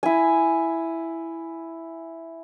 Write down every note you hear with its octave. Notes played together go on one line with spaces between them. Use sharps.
E4 G#5